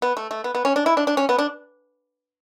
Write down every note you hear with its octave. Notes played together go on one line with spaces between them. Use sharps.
B3
A3
A3
B3
B3
C#4
D4
E4
D4
D4
C#4
B3
D4